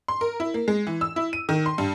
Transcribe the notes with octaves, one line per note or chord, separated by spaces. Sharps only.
C6
A#4
E4
A#3
G#3
E3
E6
E4
D#7
D#3
C6
G2